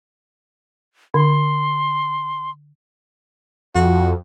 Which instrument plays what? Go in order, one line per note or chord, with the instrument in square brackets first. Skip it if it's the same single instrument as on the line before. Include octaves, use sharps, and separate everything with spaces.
[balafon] D3 [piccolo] C6
[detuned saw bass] F2 [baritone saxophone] F#4